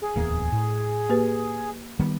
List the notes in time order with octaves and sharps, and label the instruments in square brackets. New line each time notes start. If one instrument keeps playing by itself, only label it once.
[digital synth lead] G#4
[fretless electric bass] D1 E2 A#3
A2
[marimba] A#3 G4 B4
[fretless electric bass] D#3 G3 B3